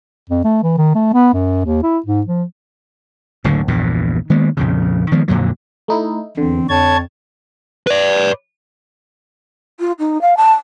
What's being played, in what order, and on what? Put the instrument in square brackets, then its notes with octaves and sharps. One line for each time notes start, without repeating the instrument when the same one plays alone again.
[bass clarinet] F2
A3
E3
D#3
A3
B3
F#2
D#2
E4
G#2
F3
[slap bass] F#1 D2 A2 D3
A#1 E2 G2 A#2
D#3 G#3 A#3 B3
A#1 F2 C#3
D#3 F3 G#3 B3
F2 A#2 D3 F#3
[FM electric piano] A3 D#4 E4
[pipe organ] E2 [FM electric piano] D3 [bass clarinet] C4
[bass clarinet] F2 [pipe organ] C#5 A5 G#6
[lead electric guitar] B4 D5
[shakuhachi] F4
D#4
F5
A5